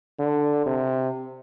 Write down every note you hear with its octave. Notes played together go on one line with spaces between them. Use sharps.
D3
C3